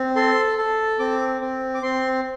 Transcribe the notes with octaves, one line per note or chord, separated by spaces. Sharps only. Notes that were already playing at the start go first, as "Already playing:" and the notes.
Already playing: C4
A4 C6
A4
C4 D6
C4
D6
C4 C6